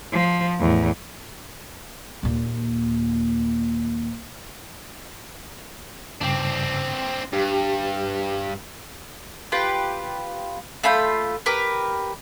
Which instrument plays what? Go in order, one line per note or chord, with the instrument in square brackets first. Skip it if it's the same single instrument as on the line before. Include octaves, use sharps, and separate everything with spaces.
[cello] F3
E2 A2
[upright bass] D#2 A#2
[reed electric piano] G2 C#3 [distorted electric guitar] C4 D4
[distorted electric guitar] G2 [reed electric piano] G4
[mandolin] F4 G4 B4
A3 F4 B5 G6
G4 A#4 B4